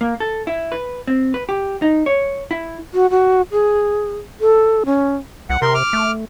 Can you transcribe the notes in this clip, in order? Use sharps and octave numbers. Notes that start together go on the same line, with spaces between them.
A#3
A4
E4
B4
C4
B4
G4
D#4
C#5
E4
F#4
F#4
G#4
A4
C#4
C2 F#5
C3 A#4 C6
D6 F6
A3